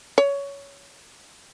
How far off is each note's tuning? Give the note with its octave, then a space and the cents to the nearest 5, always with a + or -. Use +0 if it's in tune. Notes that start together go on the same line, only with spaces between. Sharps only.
C#5 +15